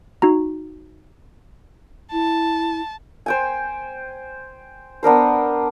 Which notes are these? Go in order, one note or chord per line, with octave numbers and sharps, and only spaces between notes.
D#4 F#4 A#5
E4 A5
C5 G5 G#5
B3 D4 A#4 C5